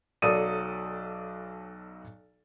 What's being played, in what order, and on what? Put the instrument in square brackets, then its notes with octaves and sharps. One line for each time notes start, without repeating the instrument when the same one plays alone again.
[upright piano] B1 F#3 A4 D5 D#6 D#7